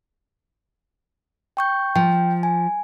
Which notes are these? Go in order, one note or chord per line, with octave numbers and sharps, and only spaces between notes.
G5 C#6 G6
F3 G5
G#5